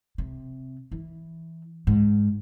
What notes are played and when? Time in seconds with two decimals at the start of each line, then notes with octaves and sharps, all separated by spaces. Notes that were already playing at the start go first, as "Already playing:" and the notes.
0.18 C3
0.91 E3
1.87 G#2